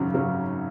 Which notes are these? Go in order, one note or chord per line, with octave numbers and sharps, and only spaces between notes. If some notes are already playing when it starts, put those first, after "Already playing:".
Already playing: G#1 F#2 C#3 F#3 C#4
C#3 F#3 C#4